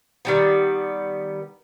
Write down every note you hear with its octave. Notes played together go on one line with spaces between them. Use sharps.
D#3 G3 B3